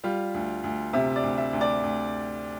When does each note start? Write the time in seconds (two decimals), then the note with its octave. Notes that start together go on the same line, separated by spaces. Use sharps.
0.04 G3 F4
0.34 D2
0.63 D2
0.93 C3 E5
1.16 D5
1.23 D2
1.38 E5
1.53 D2
1.61 D5
1.83 D2